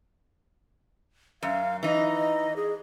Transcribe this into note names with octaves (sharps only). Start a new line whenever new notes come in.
F#2 F5
E3 D#4 D#5
G#4